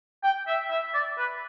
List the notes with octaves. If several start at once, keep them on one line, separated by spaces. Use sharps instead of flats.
G5
E5
E5
D5
B4